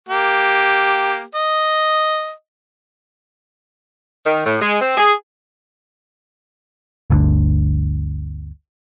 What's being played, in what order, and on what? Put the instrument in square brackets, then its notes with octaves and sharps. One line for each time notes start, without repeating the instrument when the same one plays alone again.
[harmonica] A#3 G4
D#5
[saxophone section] D#3
A2
G#3
C4
G#4
[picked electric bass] G1 D2 D3